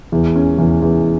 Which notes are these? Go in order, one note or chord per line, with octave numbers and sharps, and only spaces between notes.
E2
C#4
E2
E2